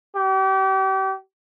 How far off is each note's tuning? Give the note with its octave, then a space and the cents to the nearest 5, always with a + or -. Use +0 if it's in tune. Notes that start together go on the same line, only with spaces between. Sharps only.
G4 -35